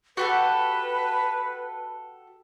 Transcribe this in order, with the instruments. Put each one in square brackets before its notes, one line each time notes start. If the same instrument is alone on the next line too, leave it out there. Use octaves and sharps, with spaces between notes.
[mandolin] F#4 G4 A4 [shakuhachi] B4